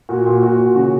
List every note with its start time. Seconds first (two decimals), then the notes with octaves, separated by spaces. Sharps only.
0.09 A#2 F#4
0.26 A#2
0.43 A#2 F#4
0.60 A#2
0.75 C#3 F#4